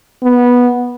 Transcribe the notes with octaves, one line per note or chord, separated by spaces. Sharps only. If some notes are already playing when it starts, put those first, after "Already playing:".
B3